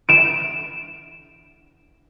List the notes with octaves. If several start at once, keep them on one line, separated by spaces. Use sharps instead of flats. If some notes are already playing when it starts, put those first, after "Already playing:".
D7 E7